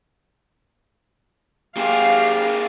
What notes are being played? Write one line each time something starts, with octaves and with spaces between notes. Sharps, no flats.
A#3 G4 G#4 F5